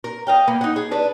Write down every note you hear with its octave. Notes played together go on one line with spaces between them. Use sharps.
A#4
D#5 F5 G5
A#3 B3
D#4 F#5
G#4
D4 B4